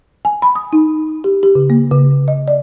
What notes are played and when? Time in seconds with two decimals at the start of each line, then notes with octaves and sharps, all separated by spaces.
0.25 G#5
0.42 B5
0.55 D#6
0.73 D#4
1.24 G4
1.43 G4
1.55 C#3
1.70 A#3
1.91 C#3
2.28 D#5
2.48 D5